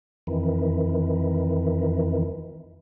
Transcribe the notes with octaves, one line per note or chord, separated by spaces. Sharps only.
F2 D#3 E3